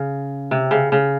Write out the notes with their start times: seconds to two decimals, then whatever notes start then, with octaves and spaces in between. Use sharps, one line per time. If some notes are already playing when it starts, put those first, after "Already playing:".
Already playing: C#3
0.51 C3
0.71 C#3
0.92 C#3